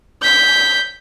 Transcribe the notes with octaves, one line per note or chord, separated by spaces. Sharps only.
G6 B6